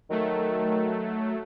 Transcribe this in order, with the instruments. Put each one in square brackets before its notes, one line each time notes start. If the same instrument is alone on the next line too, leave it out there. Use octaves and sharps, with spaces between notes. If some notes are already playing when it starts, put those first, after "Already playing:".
[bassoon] D#3 [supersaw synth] F#3 A3